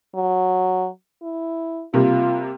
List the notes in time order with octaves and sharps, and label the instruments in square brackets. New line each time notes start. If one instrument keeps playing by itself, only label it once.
[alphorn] F#3
E4
[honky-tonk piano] C3 G3 A#3 [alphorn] F4